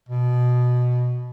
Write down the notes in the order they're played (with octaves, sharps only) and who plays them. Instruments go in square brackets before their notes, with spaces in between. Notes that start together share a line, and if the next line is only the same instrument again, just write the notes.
[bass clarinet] B2